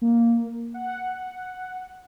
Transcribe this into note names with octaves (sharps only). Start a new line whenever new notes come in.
A#3
F#5